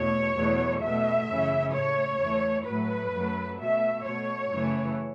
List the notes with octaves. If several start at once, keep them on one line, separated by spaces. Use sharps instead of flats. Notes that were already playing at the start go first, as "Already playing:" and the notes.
Already playing: E2 B2 A3 C#5
E2 B2 F#3 A3
B2 A3 E5
F#2 C#3 E3
A2 A3 C#5
E2 E3 A3
A2 F#3 A3 B4
F#2 F#3 A3
B2 A3 E5
B2 A3 C#5
F#2 C#3 E3 A3